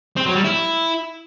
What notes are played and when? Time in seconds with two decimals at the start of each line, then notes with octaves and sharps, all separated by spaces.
0.17 C4
0.26 F#3
0.35 G3
0.45 E4